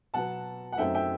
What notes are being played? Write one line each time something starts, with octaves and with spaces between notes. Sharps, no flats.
B2 F#3 B3 F#5 A5
F#5
F#2 F#3 A3 C4 D#4 E5 G5
E5 G5